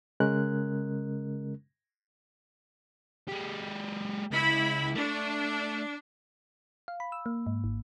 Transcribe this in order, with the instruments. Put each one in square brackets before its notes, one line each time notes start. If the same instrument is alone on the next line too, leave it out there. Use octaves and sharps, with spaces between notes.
[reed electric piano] C#3 G#3 C#4 A#4 F#6
[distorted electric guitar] G#3 G4
[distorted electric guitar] C#2 [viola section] E4 B5
[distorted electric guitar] A3 [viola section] D4
[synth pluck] F5
B5
E6
A#3
G#2
G#1